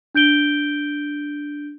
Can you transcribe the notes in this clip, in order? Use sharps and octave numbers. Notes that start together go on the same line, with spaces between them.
D4 G6 D7 G7